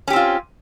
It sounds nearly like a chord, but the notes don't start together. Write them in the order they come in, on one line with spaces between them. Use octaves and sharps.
C#4 G4 C4 F4